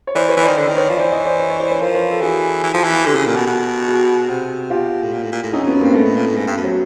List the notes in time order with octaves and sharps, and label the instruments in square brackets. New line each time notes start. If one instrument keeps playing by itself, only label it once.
[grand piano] C#5
[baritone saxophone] E3 [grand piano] C5 D5
[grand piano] B4 C#5
[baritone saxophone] E3
[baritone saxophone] D#3 [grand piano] C5 D5
[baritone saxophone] D3 [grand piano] C5 D5
[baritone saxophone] D#3
[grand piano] B4 C#5
[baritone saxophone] F3
[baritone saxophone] E3 [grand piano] C5 D5
[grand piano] C#5 D#5
C5 D5
C#5 D#5
C#5 D#5
C5 D5
B4 C#5
[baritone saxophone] F3 [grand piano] A#4 C5
[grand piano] B4 C#5
A4
[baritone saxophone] E3 [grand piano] F#4 G#4
[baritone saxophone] E3
F3
E3
[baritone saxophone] D3 [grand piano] G4 A4
[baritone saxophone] C#3
A#2
B2
B2
[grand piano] F#4 G#4
[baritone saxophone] C3
[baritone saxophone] B2 [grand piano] F4 G4
[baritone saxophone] A2
A#2
A2
A#2
A2
[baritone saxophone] E2 [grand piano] C#4 D#4
[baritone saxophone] F2 [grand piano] B3 C#4
[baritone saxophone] F#2
[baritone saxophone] G2 [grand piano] A#3 C4
[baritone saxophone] G#2 [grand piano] A3 B3
[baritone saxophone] A2
A#2
A2
G#2
G2
F#2
[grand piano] F#3